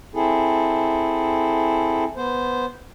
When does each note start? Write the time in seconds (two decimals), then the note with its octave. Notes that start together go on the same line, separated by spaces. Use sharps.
0.15 C4 E4 G#4 A4
2.17 B3 C5